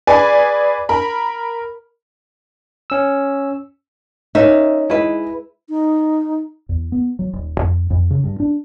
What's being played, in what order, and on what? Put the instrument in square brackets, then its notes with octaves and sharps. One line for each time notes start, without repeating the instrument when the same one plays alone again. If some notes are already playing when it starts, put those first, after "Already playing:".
[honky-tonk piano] G#4 B4 D5 G#5
A#4 B5
[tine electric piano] C#4 E6
[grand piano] C#4 A#4 C#5 [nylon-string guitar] D#4 [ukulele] E5
[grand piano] G#3 G#4 D#5 [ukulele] E4 B4
[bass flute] D#4
[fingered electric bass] E2
B3
F#3
D#1
F2
F2
C#3
G2
D4